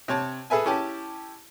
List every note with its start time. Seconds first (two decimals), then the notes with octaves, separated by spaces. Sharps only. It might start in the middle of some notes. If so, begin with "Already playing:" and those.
0.08 C3 C#5 A5
0.50 G#4 A4 B4 E5 G#5
0.66 C#4 E4 G4 A5